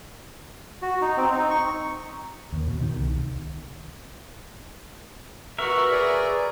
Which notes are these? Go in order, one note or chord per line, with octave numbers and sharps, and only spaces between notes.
F#4
D#4
C4
D#4
C#6
D#2
B2
D#3
C2
F#4 A#4 B4 E5
G#4 D5 A#5